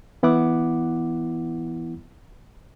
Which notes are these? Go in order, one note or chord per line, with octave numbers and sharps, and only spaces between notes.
E3 B3 E4 F#5 D6